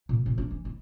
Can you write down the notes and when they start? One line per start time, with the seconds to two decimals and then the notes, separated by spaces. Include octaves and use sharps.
0.09 A#2
0.26 A#2
0.38 D4
0.51 E3
0.65 E4